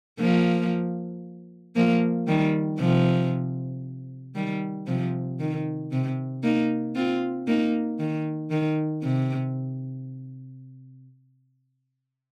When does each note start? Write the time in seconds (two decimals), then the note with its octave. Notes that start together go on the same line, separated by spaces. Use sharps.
0.20 F3 A#3
1.76 F3 A#3
2.28 D#3 G3
2.79 C3 F3
4.35 D#3 G3
4.87 C3 F3
5.40 D#3
5.92 C3
6.43 A#3 D#4
6.95 C4 F4
7.48 A#3 D#4
7.99 D#3
8.51 D#3
9.03 C3